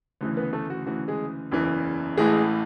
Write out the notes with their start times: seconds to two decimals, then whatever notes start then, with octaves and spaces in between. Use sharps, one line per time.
0.21 D2 C#3 E3
0.37 B3 B4
0.53 A3 A4
0.70 F#4
0.86 D2 C#3 E3 F#4
1.08 G#3 G#4
1.51 F#1 E2 C#3 E3
2.18 A1 A2 E3 G#3 G#4